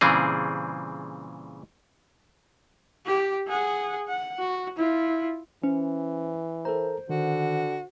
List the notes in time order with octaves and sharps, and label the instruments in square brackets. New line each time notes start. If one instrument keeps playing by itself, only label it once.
[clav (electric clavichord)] A#2 C#3 E3 G3 C4 G#4
[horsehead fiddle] G4
G#4 F#5
F#5
F#4
E4 F4
[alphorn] E3 [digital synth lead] C#4 [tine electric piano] C5
[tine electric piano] A4 A#4 A#5 [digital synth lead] C5
[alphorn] D3 [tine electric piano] D#3 [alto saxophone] F#4